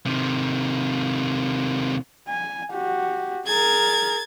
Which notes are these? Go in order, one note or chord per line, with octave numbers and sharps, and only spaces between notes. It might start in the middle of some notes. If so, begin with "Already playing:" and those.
C3 D#3
G#5
F#4 G4
G#4 A#4 G#6 A6